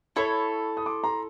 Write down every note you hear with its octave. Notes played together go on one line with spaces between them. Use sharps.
E4 A4 C#5 B5 C#6
D#6
C6 D6
A#5 C6